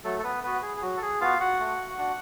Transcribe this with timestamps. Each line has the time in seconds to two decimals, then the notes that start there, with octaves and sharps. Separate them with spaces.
0.04 F#3 A3 A4
0.19 A4
0.24 B3 B4
0.44 B3 F#4 B4
0.62 G#4
0.77 G#4
0.82 F#3 F#4
0.97 A4
1.02 G#4
1.21 B3 F4 F#4 F5
1.40 F#4 F#5
1.60 A3
1.98 D4 F#4